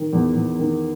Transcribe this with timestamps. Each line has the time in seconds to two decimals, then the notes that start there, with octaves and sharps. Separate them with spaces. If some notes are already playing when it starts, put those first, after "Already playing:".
Already playing: D#3
0.13 E2
0.35 E2
0.59 D#3